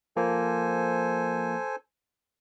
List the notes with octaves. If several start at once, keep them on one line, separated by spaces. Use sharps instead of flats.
F3 A#3 A4 C5 G#5